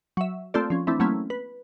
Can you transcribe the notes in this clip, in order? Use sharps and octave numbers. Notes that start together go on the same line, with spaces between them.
F#3 E5
A3 A#3 C4 F4 A4 D5
F3 C#4
E3 A3 C4 D4 E4
F#3 A3 A#3 C4 C#4 E4
B4